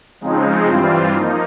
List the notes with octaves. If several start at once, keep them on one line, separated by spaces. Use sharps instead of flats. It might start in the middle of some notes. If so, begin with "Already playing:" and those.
C#3 F3 G#3 C4 D#4
G2 E3 G3 C4 F4
F3 A#3 D#4